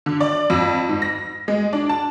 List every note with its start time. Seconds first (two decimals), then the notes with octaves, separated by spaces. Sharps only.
0.06 D3
0.20 D5
0.50 F2
0.89 G#2
1.02 A#6
1.48 G#3
1.73 D4
1.89 A5